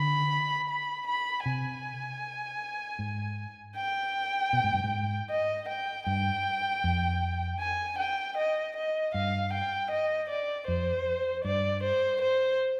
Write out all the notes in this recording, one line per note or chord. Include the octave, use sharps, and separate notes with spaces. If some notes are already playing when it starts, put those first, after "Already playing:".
Already playing: D3 B5
B5
B5
C3 G#5
G#2
G5
B2
G#2
G2
G#2
D#5
G5
G2 G5
F2
G#5
G5
D#5
D#5
G2 F5
G5
D#5
D5
F2 C5
G2 D5
C5
C5